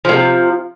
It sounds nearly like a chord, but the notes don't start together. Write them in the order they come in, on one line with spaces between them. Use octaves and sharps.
F3 A2 C3